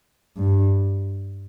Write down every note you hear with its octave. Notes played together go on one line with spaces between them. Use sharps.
G2